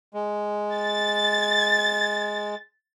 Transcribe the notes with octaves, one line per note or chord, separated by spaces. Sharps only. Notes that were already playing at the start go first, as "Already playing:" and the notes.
G#3
A6